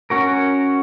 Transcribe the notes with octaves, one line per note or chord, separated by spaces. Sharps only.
C#4 F#4 A#4